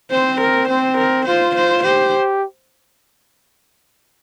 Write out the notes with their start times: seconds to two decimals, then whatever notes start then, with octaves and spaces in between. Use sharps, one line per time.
0.11 C4 C5
0.41 A#4
0.69 C4 C5
0.98 A#4
1.26 F4 C5
1.56 C5
1.84 G4 C5